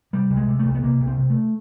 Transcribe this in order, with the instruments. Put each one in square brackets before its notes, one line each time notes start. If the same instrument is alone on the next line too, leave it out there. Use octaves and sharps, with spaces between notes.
[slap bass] C3 G3
C2
G#3
C3
A3
C2
B3
C3 A#3
C2
C4
C3
A3